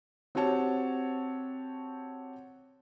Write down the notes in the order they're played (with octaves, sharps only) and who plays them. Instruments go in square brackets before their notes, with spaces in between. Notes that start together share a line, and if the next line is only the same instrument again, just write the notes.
[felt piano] C4 F#4 G4 C#5 A5